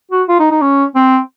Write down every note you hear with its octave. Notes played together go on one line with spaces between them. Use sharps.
F#4
F4
D#4
D#4
C#4
C4